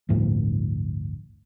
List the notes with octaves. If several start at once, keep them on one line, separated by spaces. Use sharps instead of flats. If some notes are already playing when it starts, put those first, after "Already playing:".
G1 D2 A2 F3